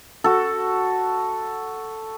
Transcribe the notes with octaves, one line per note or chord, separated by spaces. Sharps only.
F#4 A4